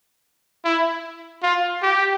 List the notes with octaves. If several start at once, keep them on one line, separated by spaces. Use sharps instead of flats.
E4
F4
G4